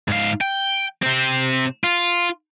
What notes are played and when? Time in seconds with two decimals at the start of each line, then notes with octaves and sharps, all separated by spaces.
0.08 G#2 F5
0.41 G5
1.02 C3 C4
1.84 F4